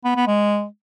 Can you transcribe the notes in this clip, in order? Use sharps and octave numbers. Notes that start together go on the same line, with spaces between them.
B3
B3
G#3